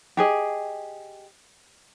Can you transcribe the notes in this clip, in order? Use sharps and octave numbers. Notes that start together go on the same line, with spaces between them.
G4 G#4 D#5